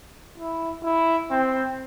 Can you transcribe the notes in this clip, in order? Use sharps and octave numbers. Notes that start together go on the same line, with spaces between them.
E4
E4
C4